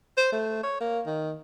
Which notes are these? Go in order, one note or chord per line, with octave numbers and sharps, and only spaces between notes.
C5
A3
C#5
A#3
D#3